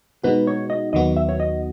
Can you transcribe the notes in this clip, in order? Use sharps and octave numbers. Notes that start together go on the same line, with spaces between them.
B2 G#3 B3 D#4 F#4 B4
C#5
D#5
D#2 D#3 F#3 B3 F#4 D#5
E5
C#5
D#5